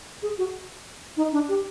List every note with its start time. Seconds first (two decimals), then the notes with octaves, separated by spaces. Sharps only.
0.23 G#4
0.38 F#4
1.17 D#4
1.32 D4
1.49 G4